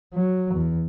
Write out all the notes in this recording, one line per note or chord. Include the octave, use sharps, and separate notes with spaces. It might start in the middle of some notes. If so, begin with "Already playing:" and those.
F#3
E2